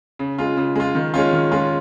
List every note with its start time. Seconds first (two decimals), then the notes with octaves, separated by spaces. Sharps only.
0.19 C#3
0.38 G#3 F4
0.57 C#3
0.75 G#3 F4
0.95 D#3
1.14 G#3 C#4 F4
1.33 D#3
1.52 G#3 C#4 F4